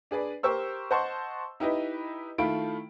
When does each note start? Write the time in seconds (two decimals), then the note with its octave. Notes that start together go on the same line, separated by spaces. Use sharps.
0.11 D4 G#4 B4 D5
0.43 G4 A#4 C5 C#6 E6
0.91 C5 D#5 F#5 A5 C6 C#6
1.60 D#4 E4 G4 B4 D#5
2.38 D#3 A3 E4 F4 B5 D7